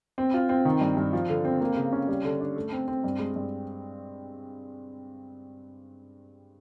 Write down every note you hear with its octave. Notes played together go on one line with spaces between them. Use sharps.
C4
F4
C4
D#3
G2
G2
F3
D3
C4
A#3
C#3
C#4
G3
D3
D4
A3
C4
C4
G2
G#3
G2